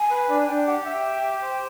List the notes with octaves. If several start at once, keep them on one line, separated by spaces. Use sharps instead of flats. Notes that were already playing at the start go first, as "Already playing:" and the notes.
Already playing: G#5
B4
D4
D4 G5
G4 F#5
E5 G5
G4
G4
C5